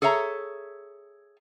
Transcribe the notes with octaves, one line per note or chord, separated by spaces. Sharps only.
G#4 A4 C#5 E5 A#5